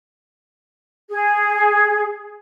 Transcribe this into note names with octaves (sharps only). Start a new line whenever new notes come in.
G#4